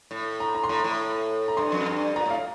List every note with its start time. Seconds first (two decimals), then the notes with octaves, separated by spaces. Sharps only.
0.11 A2
0.40 A#5
0.55 A#5
0.64 C6
0.69 A2 A#5
0.84 A2
1.48 A#5
1.57 G2 C6
1.72 F2
1.86 G2
2.16 A#2 A#5
2.26 A2
2.31 F5